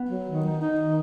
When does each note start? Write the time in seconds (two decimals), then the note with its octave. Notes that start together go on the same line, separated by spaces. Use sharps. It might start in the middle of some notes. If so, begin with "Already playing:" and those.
Already playing: B3
0.09 F#3
0.27 D#3
0.44 D#4
0.61 D#4
0.78 D#3